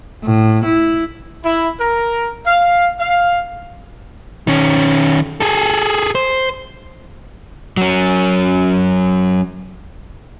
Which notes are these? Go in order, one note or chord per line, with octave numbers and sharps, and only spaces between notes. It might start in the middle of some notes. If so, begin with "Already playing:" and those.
A2
E4
E4
A#4
F5
F5
D#3 C#4
G#4 A4
C5
F#3 C#4